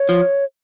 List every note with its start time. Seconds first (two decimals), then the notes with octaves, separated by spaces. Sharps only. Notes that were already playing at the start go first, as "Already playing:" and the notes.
Already playing: C#5
0.09 F3